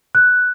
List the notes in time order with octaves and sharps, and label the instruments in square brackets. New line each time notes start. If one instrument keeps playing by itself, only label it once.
[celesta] F#6